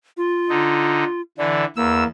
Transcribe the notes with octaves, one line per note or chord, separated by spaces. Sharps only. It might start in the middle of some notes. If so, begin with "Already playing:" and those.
F4
D3 D#4
D3 E3 D5
E2 A#3 E6